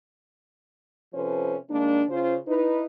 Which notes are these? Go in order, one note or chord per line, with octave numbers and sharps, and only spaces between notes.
C3 F3 C#4 A4 B4 C5
D#3 G#3 A#3 D4
C#3 C#4 F4 C5
D#4 E4 B4